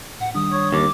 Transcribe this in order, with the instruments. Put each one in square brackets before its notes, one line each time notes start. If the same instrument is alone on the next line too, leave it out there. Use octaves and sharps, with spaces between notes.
[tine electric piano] A2 [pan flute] F#5
[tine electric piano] D#3 G3 D4 [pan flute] D#6
[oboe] C#5
[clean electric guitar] D#2 [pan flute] D6